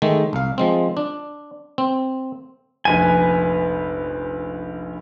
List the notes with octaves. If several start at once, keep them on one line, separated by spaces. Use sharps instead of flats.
D#3 G#3 A3
C2 F5
F3 G#3 C4
D4
C4
F1 A#1 B4 G#5 D#7